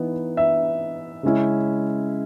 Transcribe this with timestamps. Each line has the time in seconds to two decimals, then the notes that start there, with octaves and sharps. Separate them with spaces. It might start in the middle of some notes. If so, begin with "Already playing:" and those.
Already playing: E3 B3 D#4
0.37 E5
1.23 C#3 G#3 C#4 E4